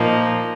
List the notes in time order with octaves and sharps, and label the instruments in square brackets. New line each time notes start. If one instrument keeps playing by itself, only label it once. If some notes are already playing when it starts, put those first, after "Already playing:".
Already playing: [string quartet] A#2 F3 A#3 D#4